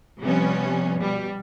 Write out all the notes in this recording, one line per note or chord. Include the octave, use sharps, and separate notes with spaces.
C3 F3 G3 B3 C#4
B2 G3